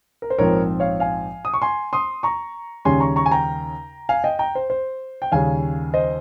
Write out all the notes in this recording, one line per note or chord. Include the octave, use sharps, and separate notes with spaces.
A#4
C5
A#1 G#2 F3 C4 A#4 C#5
C#5 F5
F5 G#5
D#6
C#6
G#5 C6
C6 D#6
A#5 C#6
D#2 C#3 G3 C#4 G#5 C6
A#5 C#6
A#5 C#6
G#5
G5 A#5
F5 G#5
D#5 G5
G5 A#5
C5
C5
G5
D#2 C#3 G3 C#4 F5 G#5
C5 D#5